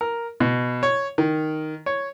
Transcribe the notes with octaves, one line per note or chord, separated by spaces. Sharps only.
A#4
B2
C#5
D#3
C#5